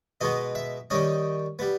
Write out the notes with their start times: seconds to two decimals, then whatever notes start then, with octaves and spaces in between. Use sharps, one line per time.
0.21 B2 G#3 B3 D#5
0.55 E5
0.90 D#3 G3 C#4 D#5
1.59 G3 B3